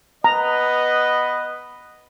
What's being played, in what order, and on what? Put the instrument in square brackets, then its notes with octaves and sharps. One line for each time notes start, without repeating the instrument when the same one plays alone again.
[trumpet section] B3 B4 D#5 [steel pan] A#5